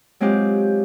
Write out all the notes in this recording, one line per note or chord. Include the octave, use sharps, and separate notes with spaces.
F#3 G#3 C4 F4 G4